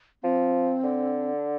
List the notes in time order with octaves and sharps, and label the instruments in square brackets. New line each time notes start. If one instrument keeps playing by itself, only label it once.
[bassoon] F3 [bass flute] C4
[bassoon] D3